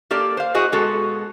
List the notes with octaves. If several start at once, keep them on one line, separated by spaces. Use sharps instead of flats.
A#3 G4 A4 D5
C5 F5
E4 F#4 G#4 C5 D#5
B2 G#3 F#4 A4